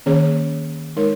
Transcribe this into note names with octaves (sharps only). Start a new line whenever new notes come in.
D#3 A#3 C#4 G#4 C#5
G#3 D#4 A#4 C#5